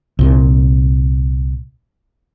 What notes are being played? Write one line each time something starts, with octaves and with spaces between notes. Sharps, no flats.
C2 A#2